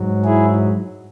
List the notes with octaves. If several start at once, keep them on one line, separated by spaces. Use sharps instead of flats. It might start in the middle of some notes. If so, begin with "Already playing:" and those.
Already playing: G#2 F#3
E4 G#4